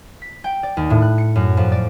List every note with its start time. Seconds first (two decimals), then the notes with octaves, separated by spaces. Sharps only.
0.22 B6
0.44 G5
0.63 D5
0.77 D#2
0.90 A2
1.02 F#6
1.18 C#7
1.35 F#2
1.57 F2
1.72 D5